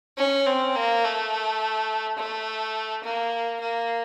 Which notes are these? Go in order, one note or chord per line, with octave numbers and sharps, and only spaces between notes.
C#4
C4
A#3
A3
A3
A#3
A#3